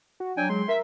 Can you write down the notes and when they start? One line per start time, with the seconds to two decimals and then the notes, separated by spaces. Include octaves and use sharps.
0.20 F#4
0.37 F#3 D4 G5 G#5
0.49 G#3 C6
0.69 A#4 E5